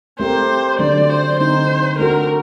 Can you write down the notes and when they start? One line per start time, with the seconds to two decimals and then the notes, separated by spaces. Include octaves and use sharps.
0.19 A3 C4 G4 A#4 C5
0.79 D3 F#3 A3 D4 D5
1.10 C5
1.39 D3 A3 C4 D#4 C5
1.98 A3 D4 F#4 A4 A#4